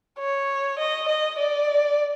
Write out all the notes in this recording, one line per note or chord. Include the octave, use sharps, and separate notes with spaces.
C#5
D#5
D#5
D5